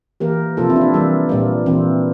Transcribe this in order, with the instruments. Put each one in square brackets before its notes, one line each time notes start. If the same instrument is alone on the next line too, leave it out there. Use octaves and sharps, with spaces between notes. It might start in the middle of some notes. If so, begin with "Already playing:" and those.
[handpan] E3 A#3 G4 A#4
C3 F3 A#3 F4 A4
C4 E4
D4
C4
E3 G3 A#3
A#2 G3 A#3
E3 A#3 C4